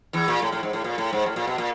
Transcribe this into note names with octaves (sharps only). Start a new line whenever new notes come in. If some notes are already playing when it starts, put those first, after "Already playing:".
E2 E3
A#2
A2
A2
G#2
A2
A#2
A2
G#2
A2
A#2
B2
A#2